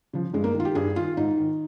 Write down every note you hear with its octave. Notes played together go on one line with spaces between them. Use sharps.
C#3 F3
G2 G#3
A#3
D#3
F4
G4
G2 G#4
D#3 F4
G#2 D#4
D#3